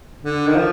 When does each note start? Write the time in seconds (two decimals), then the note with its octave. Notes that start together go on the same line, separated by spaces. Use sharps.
0.24 D3
0.47 D#3
0.56 F3